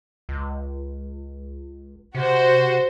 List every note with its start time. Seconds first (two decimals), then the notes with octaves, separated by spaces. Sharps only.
0.29 C#2
2.15 C3 F#4 C5